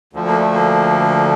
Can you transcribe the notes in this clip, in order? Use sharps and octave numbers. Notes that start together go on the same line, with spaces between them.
D2 D3 F3
A#3
A3
A#3